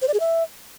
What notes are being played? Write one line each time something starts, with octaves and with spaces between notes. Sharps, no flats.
C5
D5
G#4
E5